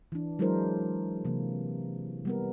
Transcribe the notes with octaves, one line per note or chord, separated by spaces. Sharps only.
E3 D4
F#3 G#3 D4 E4 A#4 C5
C3 E3 A#3
G3 B3 A#4